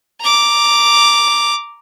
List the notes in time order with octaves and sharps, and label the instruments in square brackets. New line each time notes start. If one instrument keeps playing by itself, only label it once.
[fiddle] A#5 D6